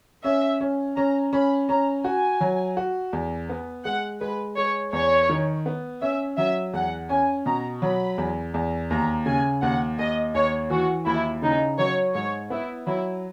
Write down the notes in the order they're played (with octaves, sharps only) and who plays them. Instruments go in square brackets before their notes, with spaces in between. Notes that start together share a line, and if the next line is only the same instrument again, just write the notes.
[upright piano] C#4 [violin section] E5
[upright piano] C#4
[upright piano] C#4 [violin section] A#5
[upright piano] C#4 [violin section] B5
[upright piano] C#4 [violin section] A#5
[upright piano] F#4 [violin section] G#5
[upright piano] F#3
F#4
E2
B3
[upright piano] G#3 [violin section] F#5
[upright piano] G#3 [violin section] B4
[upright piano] G#3 [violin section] C#5
[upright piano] E2 [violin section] C#5
[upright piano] D#3
B3
[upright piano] C#4 [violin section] E5
[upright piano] F#3 [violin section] E5
[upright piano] E2 [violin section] F#5
[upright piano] C#4 [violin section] G#5
[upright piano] B2 [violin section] A#5
[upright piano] F#3 [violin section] B5
[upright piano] E2
E2
[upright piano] D#2 [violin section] A#5
[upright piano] C#3 [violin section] G#5
[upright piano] D#2 [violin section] F#5
[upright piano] D#2 [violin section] D#5
[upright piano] D#2 [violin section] C#5
[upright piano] E3 [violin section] F#4
[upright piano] D#2 [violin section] E4
[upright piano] C#3 [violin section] D#4
[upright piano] F#3 [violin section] C#5
[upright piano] G#2 [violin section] C#5
[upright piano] B3 [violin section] E4
[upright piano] F#3 [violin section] E4